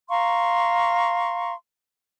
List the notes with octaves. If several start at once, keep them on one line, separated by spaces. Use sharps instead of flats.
F5 A#5 C6 C#6